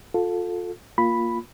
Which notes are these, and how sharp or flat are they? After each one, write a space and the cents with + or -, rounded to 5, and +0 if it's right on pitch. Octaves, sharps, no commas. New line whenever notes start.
F4 +30 A4 +0
A#3 +0 F4 +0 B5 +0